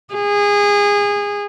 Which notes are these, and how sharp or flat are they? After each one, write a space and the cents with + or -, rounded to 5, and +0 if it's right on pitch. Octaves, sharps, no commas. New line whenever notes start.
G#4 -25